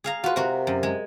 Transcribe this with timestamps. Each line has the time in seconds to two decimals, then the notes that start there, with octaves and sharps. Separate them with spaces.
0.04 G#4 F5 A#5
0.24 F4 F#4 B4
0.36 C3 F#4 A#4
0.67 F#2
0.83 G#3